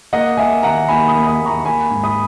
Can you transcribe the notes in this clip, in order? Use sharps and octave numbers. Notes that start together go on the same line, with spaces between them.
A#3 D#5 F#5
A#3 E5 G#5
D#2 F#5 A#5
D#2 G#5 B5
B5 D#6
D#2
B5 D#6
D#2
A#5 C#6
A#3 G#5 B5
G#2
B5 D#6